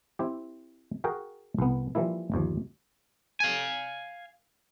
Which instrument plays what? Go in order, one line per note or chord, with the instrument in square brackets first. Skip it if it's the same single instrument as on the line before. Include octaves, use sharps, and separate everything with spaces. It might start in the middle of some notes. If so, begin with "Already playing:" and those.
[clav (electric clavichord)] C4 E4 G4
F#4 G#4 A#4 F#5 G5
C2 B3
E3 F3 G3 A#3 E4
G1 D#2 F3
[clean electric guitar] F5 G#5